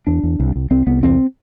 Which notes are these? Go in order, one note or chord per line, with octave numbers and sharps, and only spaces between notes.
E2 D4
E2
C2
C2
C2 C4
C2 B3
E2 C4